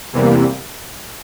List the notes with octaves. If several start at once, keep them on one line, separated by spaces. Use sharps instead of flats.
E2 C3 E3 G3 A#3